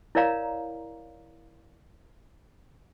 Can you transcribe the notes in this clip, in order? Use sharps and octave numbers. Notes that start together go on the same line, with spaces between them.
E4 A#4 C#5 D5 F5 A#5